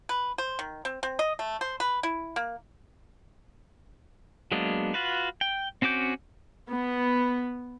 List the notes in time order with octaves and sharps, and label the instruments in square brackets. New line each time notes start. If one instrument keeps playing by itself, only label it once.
[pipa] B4
C5
D#3
C4
C4
D#5
A3
C5
B4
E4
A#3
[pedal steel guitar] F#3 G#3 A#3 B3 D4
F4 F#4 B4
G5
C4 C#4 F#4 D6 G6
[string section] B3